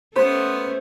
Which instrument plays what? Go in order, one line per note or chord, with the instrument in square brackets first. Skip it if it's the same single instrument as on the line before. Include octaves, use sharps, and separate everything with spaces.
[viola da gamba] A3 C#4 [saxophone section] B3 [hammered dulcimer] C5